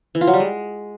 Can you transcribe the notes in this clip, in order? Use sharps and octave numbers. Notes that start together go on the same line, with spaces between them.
E3
F4
F#3
G3
G#3